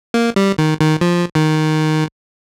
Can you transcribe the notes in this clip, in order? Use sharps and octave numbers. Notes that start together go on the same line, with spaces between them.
A#3
G3
D#3
D#3
F3
D#3